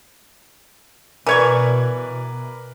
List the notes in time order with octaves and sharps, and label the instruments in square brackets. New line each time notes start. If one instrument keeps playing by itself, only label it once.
[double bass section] B2 [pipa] E3 C#5 C#6 [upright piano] A#4 B4 D5